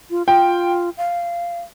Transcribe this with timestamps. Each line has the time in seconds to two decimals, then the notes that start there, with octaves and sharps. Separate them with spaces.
0.10 F4
0.27 F4 G5
0.98 F5